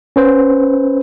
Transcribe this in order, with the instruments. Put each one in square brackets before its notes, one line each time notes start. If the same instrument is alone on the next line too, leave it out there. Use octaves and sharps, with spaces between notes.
[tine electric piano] C#4 B4 C5